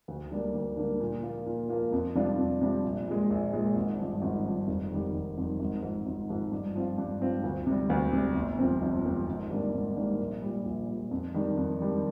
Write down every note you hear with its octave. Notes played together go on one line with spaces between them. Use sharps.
D2
D3 G3 A#3 D4
D2
D3 G3 A#3 D4
A#2
F3 A#3 F4
A#2
F3 A#3 F4
F2
C3 G3 D4 F4
F2
C3 G3 D4 F4
A#1
A#2 G#3
A#1
A#2 G#3
G#1
G2 F3
G#1
G2 F3
F1
F2 D#3 G3
F1
F2 D#3 G3
G#1
G#2 F3
G#1
G#2 F3
G2
F3 C4 F4
G2
F3 C4 F4
D2
C3 G3
D2
C3 G3
G1
F2 C3 F3 C4
G1
F2 C3 F3 C4
G#1
G#2 G3 A#3 D4
G#1
G#2 G3 A#3 D4
A#1
A#2 G3
A#1
A#2 G3
F2
D#3 G3 D4
F2
D#3 G3 D4